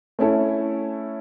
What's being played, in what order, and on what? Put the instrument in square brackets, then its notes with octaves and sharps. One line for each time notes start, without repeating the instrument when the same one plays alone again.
[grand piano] A3 C#4 E4 A4